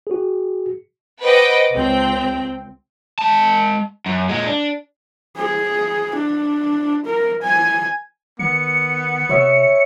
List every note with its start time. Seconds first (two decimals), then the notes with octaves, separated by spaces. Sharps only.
0.07 F#4 G#4
1.22 B4 C5 D#5 F#5 G5 D6
1.73 C#2 C4 G5
3.19 G#3 A5
4.06 F#2
4.29 A#2 G#3
4.46 D4
5.37 G#4
6.17 D4
7.05 A#4
7.42 G#5
8.39 D#3 B3 C#7
9.29 C3 C#5 E5